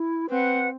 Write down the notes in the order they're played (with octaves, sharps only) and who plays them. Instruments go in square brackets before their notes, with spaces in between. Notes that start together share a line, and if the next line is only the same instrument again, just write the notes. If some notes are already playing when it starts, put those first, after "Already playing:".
Already playing: [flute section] E4
[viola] C4 [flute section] B4 F#5